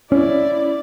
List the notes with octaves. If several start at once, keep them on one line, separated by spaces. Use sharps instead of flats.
C#4 E4 D5